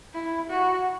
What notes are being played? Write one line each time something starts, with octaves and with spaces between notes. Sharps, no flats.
E4
F#4